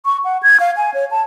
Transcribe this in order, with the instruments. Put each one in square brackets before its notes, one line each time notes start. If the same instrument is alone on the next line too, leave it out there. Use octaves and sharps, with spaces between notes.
[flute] C#6
F#5
G#6
F5
G#5
C#5
A5